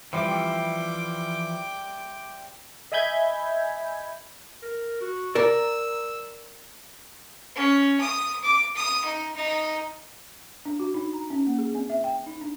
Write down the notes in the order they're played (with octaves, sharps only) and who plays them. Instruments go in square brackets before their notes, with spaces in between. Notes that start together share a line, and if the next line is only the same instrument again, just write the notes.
[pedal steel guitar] E3 F3 [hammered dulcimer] G3 C4 E5 [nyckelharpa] G5 D6
[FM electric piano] D#5 E5 G#5 B5 G6 G#6
[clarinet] A#4
F#4
[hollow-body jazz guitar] A#4 D5 [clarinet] E6
[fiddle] C#4
D#6
D6
D#6
D#4
D#4
[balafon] D4
F#4
D#4
A#5
C#4
A#3
G#4
C4
E5
G5
D#4
D4